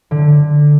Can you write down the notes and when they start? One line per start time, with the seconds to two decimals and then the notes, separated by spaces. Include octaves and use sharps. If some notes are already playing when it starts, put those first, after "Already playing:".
0.11 D3